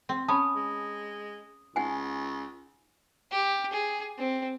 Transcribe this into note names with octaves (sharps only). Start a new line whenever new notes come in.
C4
C#4 A5 B5 D#6
G#3
C#2 D#4 F#5 G#5
G4
G#4
C4